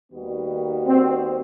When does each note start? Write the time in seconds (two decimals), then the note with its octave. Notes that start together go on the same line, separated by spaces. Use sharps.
0.13 D#2 D#3 G3 B3 F#4
0.86 C4